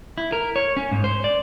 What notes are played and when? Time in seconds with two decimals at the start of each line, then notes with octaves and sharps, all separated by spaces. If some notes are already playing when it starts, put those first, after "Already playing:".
0.18 E4
0.32 A#4
0.56 C#5
0.77 C#4
0.91 G#2
1.04 C5
1.24 D5